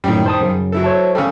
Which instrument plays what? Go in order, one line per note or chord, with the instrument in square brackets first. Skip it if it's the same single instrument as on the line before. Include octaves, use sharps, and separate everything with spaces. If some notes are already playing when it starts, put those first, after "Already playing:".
[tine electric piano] F#2 A2 [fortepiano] D#3 G3
[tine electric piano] C5 A5 D#6
F#2 C#3
[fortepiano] F#3 E4 A4
[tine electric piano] C5 C#5 A5
[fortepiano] C#3 G3 [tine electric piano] A4